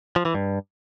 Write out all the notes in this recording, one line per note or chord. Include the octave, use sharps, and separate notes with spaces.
F3
E3
G2